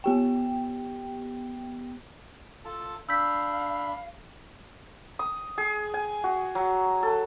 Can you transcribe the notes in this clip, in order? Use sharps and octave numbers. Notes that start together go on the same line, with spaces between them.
B3 G4 G5
F4 A4 A5
D4 F5 B5 E6 G6 B6
D#6
G#4
G#5
F#4
F#3
A4